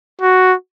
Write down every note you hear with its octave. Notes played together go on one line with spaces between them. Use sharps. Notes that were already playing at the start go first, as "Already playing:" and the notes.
F#4